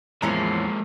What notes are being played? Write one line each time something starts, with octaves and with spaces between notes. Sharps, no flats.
E2 A2 E3 F3 G#3 A#3 C#4 A#5